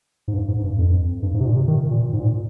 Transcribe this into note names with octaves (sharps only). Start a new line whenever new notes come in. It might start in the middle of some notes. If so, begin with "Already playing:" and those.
G#2
G2
G#2
G2
F2
G2
G#2
C3
A#2
C3
D#3
A#2
G#2
A#2